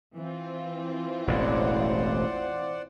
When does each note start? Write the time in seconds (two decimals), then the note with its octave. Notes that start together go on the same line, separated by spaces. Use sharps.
0.17 E3 C4 F4
1.27 E1 A1 A2 C5 D5 F#5